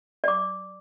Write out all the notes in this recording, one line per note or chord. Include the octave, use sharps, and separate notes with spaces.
D5 D6